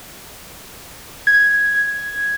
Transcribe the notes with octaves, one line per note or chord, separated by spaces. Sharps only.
G#6